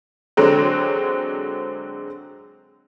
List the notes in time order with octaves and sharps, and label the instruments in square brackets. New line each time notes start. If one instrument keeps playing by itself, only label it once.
[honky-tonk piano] D3 F#3 G#3 C4